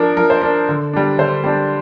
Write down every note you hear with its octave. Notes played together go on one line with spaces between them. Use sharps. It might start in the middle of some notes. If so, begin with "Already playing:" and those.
Already playing: F3 D4 A#4
F3 A#4
C5
D4 A#4
D3
G3 D4
D3 C5
G3 D4